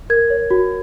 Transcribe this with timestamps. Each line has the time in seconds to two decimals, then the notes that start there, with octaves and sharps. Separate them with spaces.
0.10 A#4 G#6
0.30 C#5
0.51 F#4